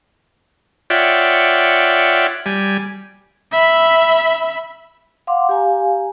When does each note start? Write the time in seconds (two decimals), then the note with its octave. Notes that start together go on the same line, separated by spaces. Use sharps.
0.90 F4 C#5 D5 E5 F#5 G5
2.46 G3 G#5
3.52 E5 B5
5.27 F5 F#5 C6 D6
5.49 G4 F5 G#5 A#5